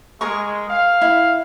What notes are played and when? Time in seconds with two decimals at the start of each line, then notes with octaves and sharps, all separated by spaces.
0.21 G#3 A#4 G#5 C#6
0.70 F5
1.01 E4